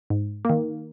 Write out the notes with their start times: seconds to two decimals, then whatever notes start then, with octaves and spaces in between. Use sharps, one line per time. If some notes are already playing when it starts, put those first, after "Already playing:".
0.10 G#2
0.45 D#3 A#3